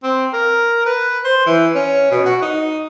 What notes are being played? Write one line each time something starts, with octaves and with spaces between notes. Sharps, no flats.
C4
A#4
B4
C5
E3
C#4
B2
F#4
D#4